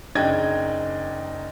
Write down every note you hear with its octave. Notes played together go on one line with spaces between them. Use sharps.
F#1 D4 D#4 D#5 G5 G#6